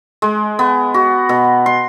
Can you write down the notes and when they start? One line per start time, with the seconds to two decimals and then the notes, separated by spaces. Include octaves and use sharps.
0.22 G#3
0.59 B3
0.94 F#4
1.29 B2
1.66 C6